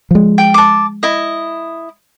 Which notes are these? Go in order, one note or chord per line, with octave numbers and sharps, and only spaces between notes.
F3 G#3
G5
A5 D6
E4 D#5